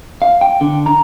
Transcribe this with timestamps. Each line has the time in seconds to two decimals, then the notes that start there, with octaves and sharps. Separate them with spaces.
0.22 F5
0.41 G5
0.61 D3
0.86 A#5